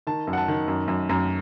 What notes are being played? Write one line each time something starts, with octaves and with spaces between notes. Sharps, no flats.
D#3 A5
F#2
F#5
A5
D#3
F#2
F#2
F#2